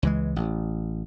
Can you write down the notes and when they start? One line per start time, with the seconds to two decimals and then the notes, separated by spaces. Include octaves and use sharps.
0.03 C#2 E3 G#3
0.36 A1